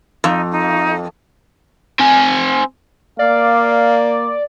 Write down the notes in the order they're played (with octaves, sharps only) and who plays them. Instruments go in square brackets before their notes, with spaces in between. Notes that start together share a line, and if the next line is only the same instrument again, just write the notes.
[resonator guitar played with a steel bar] F2 [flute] D#4
[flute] D#4
[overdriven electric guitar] C4 G#5
[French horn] A#3 [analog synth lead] D5 [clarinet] F5